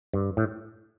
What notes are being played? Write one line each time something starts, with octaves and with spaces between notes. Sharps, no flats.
G2
A2